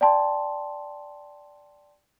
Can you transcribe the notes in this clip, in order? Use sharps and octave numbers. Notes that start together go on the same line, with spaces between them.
D5 G5 A5 C6